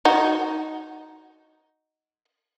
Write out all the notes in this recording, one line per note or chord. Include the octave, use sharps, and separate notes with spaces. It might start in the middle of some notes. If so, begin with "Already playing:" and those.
D#4 F#4